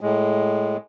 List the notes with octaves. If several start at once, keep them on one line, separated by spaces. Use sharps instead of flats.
A2 G#3